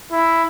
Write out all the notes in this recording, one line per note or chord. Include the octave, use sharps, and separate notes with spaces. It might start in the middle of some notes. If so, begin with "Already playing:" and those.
E4